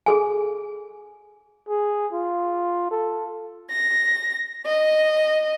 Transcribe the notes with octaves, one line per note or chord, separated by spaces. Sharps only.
G#4 A4 G#5
G#4
F4
A4
A#6
D#5